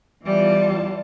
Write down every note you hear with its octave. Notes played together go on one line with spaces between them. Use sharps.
E2 E3 G3 F4 A5